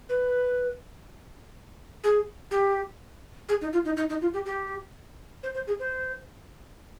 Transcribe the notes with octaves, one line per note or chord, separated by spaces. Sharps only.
B4
G#4
G4
G#4
D#4
F4
D#4
D#4
D#4
F4
G4
G4
C5
C5
G#4
C5